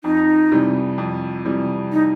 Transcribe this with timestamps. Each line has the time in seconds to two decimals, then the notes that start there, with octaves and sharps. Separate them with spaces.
0.04 F2 D#4
0.52 C3 E3 G3
0.98 F2
1.45 C3 E3 G3
1.92 D#4